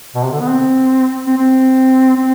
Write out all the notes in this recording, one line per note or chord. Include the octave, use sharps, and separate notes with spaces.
B2
C3
D3
B3
C4
C4
C4
C4